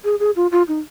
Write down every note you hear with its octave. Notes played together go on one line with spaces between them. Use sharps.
G#4
G#4
F4
F4
D#4